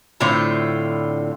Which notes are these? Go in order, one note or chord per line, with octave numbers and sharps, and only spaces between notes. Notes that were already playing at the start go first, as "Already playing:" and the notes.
A2 D3 C4 F4